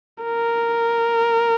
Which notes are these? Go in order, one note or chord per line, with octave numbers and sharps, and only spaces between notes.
A#4